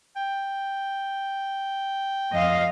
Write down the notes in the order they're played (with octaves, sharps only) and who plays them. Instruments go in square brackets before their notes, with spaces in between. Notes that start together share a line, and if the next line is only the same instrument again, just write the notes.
[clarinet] G5
[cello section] F2 D#5 F5